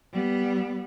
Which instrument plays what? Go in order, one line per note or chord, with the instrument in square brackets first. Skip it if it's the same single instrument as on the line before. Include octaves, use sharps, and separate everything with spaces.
[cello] G3 B3